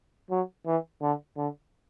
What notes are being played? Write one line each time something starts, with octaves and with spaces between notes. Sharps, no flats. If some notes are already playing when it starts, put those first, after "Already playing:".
F#3
E3
D3
D3